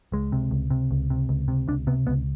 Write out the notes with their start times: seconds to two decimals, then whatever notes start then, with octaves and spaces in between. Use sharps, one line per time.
0.12 C#2 G#3
0.32 C3
0.51 C#2
0.70 C3
0.91 C#2
1.10 C3
1.29 C#2
1.48 C3
1.68 C#2 D4
1.87 C3 B3
2.07 C#2 B3